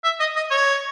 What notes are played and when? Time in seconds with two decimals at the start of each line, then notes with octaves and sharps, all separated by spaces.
0.04 E5
0.20 D#5
0.36 D#5
0.50 C#5